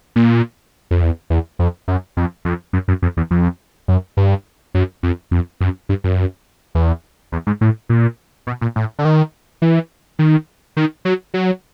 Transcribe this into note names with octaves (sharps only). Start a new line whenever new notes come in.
A#2
F2
E2
E2
F2
F#2
F2
F2
F#2
F#2
F2
E2
F2
F#2
G2
F#2
F2
F2
F#2
G2
F#2
E2
E2
G#2
A2
A#2
B2
A#2
A2
D3
D#3
E3
D#3
D#3
F#3
F#3